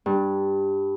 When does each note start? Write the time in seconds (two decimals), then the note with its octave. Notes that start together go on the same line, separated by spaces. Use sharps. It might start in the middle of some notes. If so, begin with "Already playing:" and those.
0.06 G2